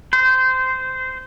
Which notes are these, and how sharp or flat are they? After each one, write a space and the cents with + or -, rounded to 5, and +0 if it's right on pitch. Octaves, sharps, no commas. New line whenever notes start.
C5 -20